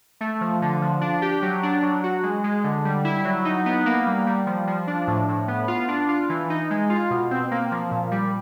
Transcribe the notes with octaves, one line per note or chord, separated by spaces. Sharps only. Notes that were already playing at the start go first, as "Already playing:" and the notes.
A3
F3
D3
F3
D4
G4
F#3
D4
F#3
F#4
G#3
G#3
D3
G3
E4
F#3
D#4
B3
A#3
G3
G3
F3
F3
D4
A2
A2
B3
F4
D4
F4
E3
D#4
G#3
F4
B2
C4
A#3
F3
A#2
G3